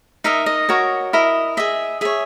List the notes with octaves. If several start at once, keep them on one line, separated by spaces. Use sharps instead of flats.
D#4 A#4 D#5 E5
D#5
F#4 A#4 C#5
E4 A#4 D#5
G#4 D#5 E5
G#4 C#5 E5